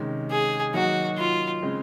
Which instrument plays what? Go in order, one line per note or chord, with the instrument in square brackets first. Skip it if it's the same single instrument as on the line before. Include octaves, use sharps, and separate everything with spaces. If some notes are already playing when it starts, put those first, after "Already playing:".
Already playing: [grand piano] C3 D#3 G#3 C#4
[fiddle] G#4
[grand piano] D#3 F#3 A#3 D#4 [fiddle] F#4
[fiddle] F4
[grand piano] C#3 G#3 C4